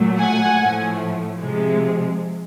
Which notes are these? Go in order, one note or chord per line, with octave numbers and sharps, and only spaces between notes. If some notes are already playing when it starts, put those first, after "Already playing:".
Already playing: A#2 F#3 A3
F#5 G#5
A2 F3 A3
C3 F3 G#3